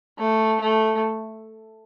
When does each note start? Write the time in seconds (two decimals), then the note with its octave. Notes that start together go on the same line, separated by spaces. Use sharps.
0.18 A3
0.60 A3